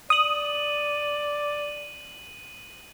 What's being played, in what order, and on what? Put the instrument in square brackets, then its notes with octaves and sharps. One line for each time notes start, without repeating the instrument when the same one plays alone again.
[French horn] D5 [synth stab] D#6 [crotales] D#7 F#7